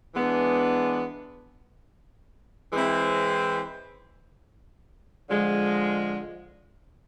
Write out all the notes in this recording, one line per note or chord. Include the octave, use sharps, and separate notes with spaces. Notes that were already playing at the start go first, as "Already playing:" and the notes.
E3 G#3 B3 D4
E3 G#3 C4 E4
D3 F3 G#3